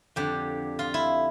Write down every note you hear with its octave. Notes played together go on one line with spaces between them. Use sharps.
F2 D3 G4
F4
E4